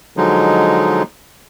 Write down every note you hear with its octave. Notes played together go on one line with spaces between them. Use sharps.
D3 F3 F#3 G#3 D#4